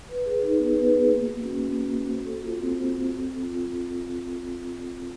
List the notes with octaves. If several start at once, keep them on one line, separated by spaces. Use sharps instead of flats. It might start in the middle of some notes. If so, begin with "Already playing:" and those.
B4
G#4
D#4
B3
B4
G#4
A#3
F#4
C#4
A#3
A#3
F#4
C5
A4
F4
C4
C5
A4
C4
A4
F4
C4
C4